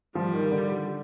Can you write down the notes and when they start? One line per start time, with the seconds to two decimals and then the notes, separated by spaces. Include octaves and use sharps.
0.15 F3 G3
0.33 D#3
0.51 D3